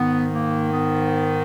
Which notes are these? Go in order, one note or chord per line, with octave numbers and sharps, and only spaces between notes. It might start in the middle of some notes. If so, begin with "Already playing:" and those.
Already playing: G#2 D#3 B3
A#3
B3